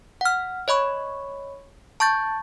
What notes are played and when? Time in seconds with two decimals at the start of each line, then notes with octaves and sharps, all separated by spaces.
0.21 F#5 F6
0.68 C#5 D#5 B5 C#6
2.00 A5 C#6 G6 A6